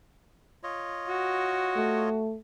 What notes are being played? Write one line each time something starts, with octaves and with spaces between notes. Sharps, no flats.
F4 C#5 D#5
F#4
A3